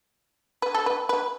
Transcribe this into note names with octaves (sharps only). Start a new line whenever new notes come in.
B4
A4
B4
B4